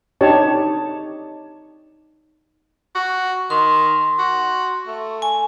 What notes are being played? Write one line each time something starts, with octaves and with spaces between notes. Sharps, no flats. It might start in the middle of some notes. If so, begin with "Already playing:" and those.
D4 D#4 G4 C#5 A5
F#4
D#3 C6
F#4
A3
G#5